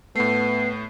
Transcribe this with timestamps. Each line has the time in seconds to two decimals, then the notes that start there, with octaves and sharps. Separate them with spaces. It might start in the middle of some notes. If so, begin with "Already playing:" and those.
0.15 A2 A3 B3 C7